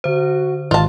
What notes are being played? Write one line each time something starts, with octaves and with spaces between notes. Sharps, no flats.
D3 F#4 C5
G#1 F4 A5